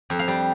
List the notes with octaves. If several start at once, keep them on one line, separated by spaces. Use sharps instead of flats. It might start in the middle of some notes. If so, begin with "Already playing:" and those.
F2
F5
G3